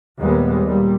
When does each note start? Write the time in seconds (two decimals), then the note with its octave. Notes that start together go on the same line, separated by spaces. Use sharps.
0.21 D#2 A#2 G3 G#3 B3
0.66 A#2 G3